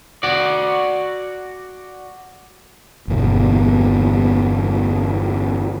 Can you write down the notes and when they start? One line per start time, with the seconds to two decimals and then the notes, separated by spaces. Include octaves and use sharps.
0.23 F#4 D5
3.08 G1 E2 B2